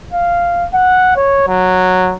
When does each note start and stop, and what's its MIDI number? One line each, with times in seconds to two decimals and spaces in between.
0.12 0.66 77
0.74 1.13 78
1.17 1.47 73
1.48 2.15 54